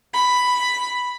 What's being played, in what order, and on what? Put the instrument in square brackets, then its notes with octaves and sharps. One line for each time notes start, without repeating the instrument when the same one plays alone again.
[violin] B5